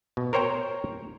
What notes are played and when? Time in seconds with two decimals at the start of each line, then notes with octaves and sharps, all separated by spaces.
0.17 B2
0.33 A#4 C5 C#5 G5 A#5